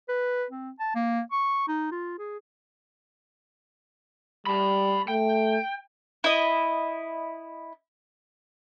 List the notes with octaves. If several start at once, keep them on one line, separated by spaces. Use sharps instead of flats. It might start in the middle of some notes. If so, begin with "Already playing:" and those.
B4
C4
A5
A#3
C#6
D#4
F4
G#4
G3 A5 B5
A3 G5
E4 D#5